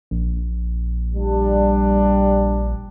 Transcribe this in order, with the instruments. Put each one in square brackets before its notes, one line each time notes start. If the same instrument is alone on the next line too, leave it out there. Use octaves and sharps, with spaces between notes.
[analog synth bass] A#1
[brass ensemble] G3 D4